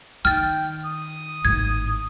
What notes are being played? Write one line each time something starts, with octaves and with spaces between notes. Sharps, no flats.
D#3 G5 F6 A6
D#6
G#1 A2 G#6